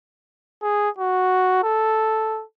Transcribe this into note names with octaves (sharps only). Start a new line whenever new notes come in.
G#4
F#4
A4